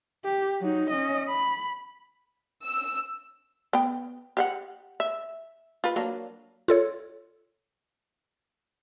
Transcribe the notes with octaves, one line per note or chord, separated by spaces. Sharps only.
G4
F#3 D#4
C#4 D#5
B5
E6
B3 G5
G4 F5 F#5
E5
F4 B4
F#3 A#3 D4
F4 A4 C#5